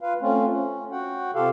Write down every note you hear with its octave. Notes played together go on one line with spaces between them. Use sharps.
F4 B4 F5
A3 C4 C#4 F4
C#4
F#4 F#5 G5
C3 F4 G4 A4 F5